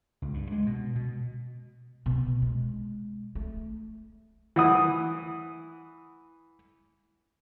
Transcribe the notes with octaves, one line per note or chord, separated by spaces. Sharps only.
C#2
G2
G#3
B2
B2
B2
G#3
A3
E3 F#5 D#6